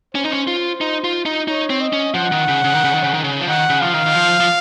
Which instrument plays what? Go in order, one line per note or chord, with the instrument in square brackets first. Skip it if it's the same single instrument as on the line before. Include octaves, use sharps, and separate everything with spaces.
[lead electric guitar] C#4 [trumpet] C5
[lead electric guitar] D#4
C#4
F4
D#4
F4
D#4
[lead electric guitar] D#4 [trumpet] C#5
[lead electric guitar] C4
[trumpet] D#5
[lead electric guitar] C#4
[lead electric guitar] F3 [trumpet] F#5
[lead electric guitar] D#3
C#3
C#3
D#3
C#3
D#3
C#3
D#3
C#3
F3
[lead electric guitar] D#3 [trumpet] F#5
[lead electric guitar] C#3
[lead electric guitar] F3 [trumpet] F5
[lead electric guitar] D#3
D#3
F3
F3